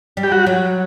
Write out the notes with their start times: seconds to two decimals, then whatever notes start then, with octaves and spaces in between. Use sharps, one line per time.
0.17 G3
0.23 G4
0.32 F#4
0.46 F#3